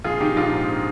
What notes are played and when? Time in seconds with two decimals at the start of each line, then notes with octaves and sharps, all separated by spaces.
0.04 A#1 F4 G#4
0.20 D#3 D#4 G4
0.36 A#1 D4 F4
0.53 G#2